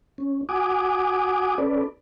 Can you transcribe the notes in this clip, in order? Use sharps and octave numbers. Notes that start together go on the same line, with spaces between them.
C#4
F#4 F#5 G#5 D6 D#6
C#4 A4 B4 D5